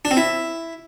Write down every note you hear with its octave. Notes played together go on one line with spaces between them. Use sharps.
D4
C4
E4